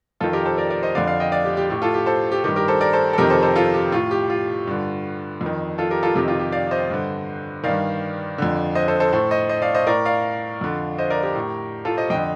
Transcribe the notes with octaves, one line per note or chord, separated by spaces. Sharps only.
F2 D#3 F4 A4
G4 A#4
A4 C5
A#4 D5
A#4 D5
C5 D#5
F2 D3 D5 F5
D5 F5
D#5 G5
D5 F5
G4
G4
A2 G4
F4 A4
G4
A4 C5
G4
G2 D#3 G4
G4 A#4
A4 C5
A#4 D5
A4 C5
A4
F2 C3 D#3 G4 A#4
A4 C5
A4 C5
F4 A4
G4
A2 F4
G4
F4
G2 D3
F2
D#3
F4 A4
G4 A#4
F4 A4
F2 C3 D#3 G4
F4
G4
D5 F5
C5 D#5
G2 D3
G2 D#3 D5 F5
F2 D3
C5 D#5
A4 C5
A4 C5
A2 A4 C5
C5 D#5
C5 D#5
D5 F5
C5 D#5
A2 A#4 D5
D5 F5
F2 D3
C5 D#5
A#4 D5
G4 A#4
A2
F4 A4
C5 D#5
F2 D3 D#5 G5